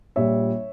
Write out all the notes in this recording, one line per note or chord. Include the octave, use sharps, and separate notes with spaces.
A#1 A#2 G3 C#5 E5